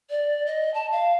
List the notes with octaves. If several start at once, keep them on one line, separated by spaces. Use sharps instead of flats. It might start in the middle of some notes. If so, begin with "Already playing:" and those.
D5
D#5
A5
F5